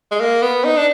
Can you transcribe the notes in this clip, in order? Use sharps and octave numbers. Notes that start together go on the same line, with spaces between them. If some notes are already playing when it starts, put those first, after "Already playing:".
G#3
A#3
B3
D#4
D4